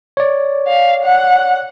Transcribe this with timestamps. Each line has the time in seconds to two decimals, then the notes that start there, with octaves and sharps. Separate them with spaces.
0.17 C#5 D5
0.68 F5
1.04 F#5